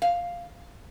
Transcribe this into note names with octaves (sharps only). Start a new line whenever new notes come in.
F5